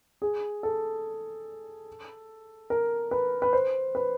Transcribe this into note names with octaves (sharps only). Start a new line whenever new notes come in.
G#4
A4
A#4
B4
B4
C5
B4